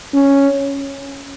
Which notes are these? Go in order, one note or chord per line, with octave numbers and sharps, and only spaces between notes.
C#4